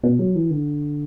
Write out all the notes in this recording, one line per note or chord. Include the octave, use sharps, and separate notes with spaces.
B2
F#3
E3
D3